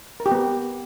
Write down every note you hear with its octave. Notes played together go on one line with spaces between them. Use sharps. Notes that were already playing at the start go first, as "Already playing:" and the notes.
A#4
G4
B3